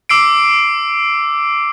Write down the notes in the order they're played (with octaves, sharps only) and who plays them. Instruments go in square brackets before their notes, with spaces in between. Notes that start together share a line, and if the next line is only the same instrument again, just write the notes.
[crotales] D6 E6 C7 D7